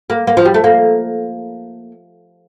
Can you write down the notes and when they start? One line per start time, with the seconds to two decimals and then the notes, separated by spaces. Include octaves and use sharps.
0.10 A#3
0.27 A#3
0.37 F3
0.45 G3
0.54 A3
0.64 A#3